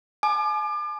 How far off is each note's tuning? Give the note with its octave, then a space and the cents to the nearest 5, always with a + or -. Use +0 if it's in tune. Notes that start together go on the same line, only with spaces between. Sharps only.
G#5 +45 D6 +35